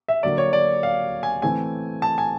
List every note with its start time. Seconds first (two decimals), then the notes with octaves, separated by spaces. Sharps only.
0.08 E5
0.23 D3 F#3 A#3 D5
0.38 C#5
0.53 D5
0.83 F5
1.23 G#5
1.42 E3 A3 C4 G#5
2.02 A5
2.18 G#5